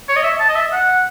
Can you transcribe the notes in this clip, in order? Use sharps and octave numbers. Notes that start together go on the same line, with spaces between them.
C#5
D#5
E5
A5
D#5
E5
F#5